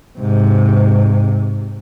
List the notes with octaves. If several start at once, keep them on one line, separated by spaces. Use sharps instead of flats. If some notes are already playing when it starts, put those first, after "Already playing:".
G#2 C3